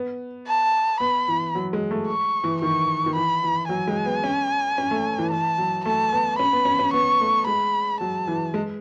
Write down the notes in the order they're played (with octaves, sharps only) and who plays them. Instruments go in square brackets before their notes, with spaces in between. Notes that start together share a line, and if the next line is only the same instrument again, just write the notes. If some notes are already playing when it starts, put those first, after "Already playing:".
Already playing: [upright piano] B3
[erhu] A5
[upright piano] B3 [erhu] B5
[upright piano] E3
F#3
G#3
A3
[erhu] C#6
[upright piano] E3
[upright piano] D#3 [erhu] C#6
[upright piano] D#3
[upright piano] E3 [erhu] B5
[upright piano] E3
[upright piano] F#3 [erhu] G#5
[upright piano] G#3
B3
C#4
C#4
A3
E3
[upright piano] E3 [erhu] A5
[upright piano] F#3
[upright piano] A3 [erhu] A5
[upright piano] B3
[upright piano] C#4 [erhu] B5
[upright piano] B3
C#4
C#4
[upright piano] B3 [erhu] C#6
[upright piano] A3
[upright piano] G#3 [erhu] B5
[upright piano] F#3 [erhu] A5
[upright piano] E3
G#3